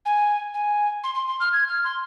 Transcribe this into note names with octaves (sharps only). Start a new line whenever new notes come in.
G#5
G#5
C6
C6
C6
F6
G#6
F6
C6